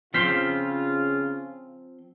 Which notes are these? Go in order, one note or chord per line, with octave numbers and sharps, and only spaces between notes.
C#3 F3 C4 F4 C6 F6 G6 B6